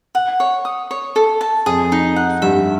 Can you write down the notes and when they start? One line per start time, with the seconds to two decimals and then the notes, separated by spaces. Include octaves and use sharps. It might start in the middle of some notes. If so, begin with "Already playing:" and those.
0.15 F#5
0.40 C#5
0.65 D#6
0.91 C#5
1.16 A4
1.41 A5
1.66 F2 G#4
1.92 D#4
2.16 F#5
2.42 G2 E5